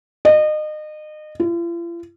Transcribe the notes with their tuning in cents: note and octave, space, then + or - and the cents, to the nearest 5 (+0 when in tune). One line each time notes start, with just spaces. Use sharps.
D#5 -30
F4 -45